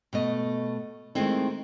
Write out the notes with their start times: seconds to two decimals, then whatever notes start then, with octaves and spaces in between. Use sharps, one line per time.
0.13 B2 A3 D#5
1.15 D#3 G#3 A3 C4 E4